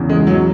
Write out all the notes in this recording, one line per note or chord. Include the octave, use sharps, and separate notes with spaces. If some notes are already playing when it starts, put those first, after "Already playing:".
Already playing: E2 C#3 E3
G#3
F#3